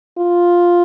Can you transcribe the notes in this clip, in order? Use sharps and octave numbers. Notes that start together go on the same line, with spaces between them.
F4